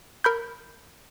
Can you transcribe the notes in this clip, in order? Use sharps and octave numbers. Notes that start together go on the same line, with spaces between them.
A#4 B5 G6